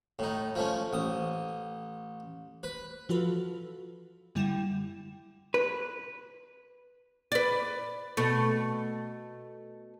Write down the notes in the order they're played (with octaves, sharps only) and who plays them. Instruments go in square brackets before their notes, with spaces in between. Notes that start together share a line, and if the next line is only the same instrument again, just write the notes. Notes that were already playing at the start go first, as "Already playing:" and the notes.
[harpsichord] A2 D#4
F3 A3 C#4
A1 D#6
B4
[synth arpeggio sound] E3 F3 F4 F#4 A4 B4
F#2 D3 G3 E4 G5 E7
[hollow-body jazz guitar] B4
[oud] B4 D5
B2 A3